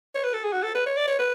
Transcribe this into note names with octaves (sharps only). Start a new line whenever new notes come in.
C#5
B4
A4
G#4
F#4
A4
B4
C#5
D5
C#5
B4